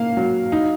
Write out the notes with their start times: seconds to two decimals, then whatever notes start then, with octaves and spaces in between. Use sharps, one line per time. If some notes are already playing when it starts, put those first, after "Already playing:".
Already playing: A#3 F5
0.17 F#3
0.52 D#4